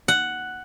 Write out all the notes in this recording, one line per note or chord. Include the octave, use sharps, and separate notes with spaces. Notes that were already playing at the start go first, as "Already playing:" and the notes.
F#5